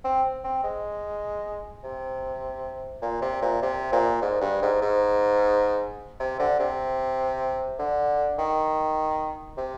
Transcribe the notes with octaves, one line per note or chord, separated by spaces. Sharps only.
C4
C4
G#3
C3
A#2
C3
A#2
C3
A#2
G#2
G2
G#2
G#2
C3
D3
C3
D3
D#3
C3